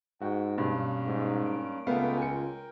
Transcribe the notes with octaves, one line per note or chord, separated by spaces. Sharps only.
G#2 F#4 G5
G2 B2 A#3 C#4
G#2
D7
C#2 A3 B3 A#4 F5 G5
F4 G#5 C#7